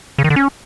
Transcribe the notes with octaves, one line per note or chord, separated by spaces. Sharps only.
C#3
D#3
D3
C#4